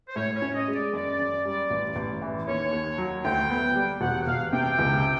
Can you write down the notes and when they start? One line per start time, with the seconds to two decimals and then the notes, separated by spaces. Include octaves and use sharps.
0.09 C5
0.16 A2 C#5
0.35 C#5
0.42 C#4
0.55 D#5
0.68 G#3
0.75 D5
0.93 F#2 D5
1.19 F#2
1.45 G3
1.71 A1
1.96 A1
2.22 E3
2.47 D#2 C#5
2.72 D#2
2.98 F#3
3.25 D2 G5
3.50 B3
3.75 G3
4.01 E1 F#5
4.27 E1 F5
4.53 C3 G5
4.79 C#2